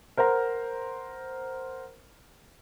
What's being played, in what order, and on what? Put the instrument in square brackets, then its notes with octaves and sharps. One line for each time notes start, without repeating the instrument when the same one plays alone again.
[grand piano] A#4 C5 F#5 A#5